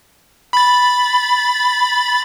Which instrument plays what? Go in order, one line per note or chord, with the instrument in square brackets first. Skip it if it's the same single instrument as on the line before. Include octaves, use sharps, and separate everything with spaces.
[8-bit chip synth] B5 A6